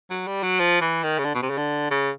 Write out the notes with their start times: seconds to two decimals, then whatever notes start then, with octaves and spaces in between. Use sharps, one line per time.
0.10 F#3
0.27 G3
0.43 F#3
0.59 F3
0.81 E3
1.03 D#3
1.18 C#3
1.25 D3
1.34 B2
1.42 C3
1.50 C#3
1.57 D3
1.91 C#3